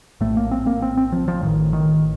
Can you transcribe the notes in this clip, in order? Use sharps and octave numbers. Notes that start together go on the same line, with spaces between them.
A#1 A2 A3
A#3
C4
A#3
C4
C4
F3
F3
A1 A2 D#3
D#3